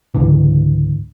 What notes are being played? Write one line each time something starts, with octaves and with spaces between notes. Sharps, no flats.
C#2 G#2 D3 E3